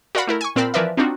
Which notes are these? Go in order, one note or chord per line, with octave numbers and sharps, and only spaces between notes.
F#4 A#4 D5 F5 F#5 B5
A3 E4 A#4
G#5 C#6
A#2 C4 A#4 A5 B5 F6
E3 F3 A#4 B4 D5 E5
C4 D4 D#4 F4 F#4